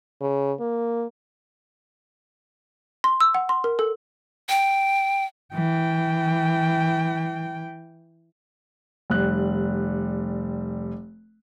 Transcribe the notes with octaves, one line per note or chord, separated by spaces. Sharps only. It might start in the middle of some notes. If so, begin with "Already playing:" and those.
C#3
A#3
C6
E6
F#5
C6
A#4
A4
G5
E3 G5
F1 G3 F#6